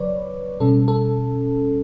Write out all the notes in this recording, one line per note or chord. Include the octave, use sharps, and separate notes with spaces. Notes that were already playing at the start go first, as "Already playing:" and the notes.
Already playing: C#3 F#3 B4 C#5 D5
B2 G3 C#4 A4
A4